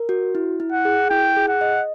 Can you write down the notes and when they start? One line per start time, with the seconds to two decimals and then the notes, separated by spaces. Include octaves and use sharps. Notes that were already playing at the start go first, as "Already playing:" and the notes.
Already playing: A#4
0.09 F#4
0.35 E4
0.60 E4
0.72 F#5
0.85 G#4
1.10 E4 G5
1.36 G#4
1.48 F#5
1.61 D#5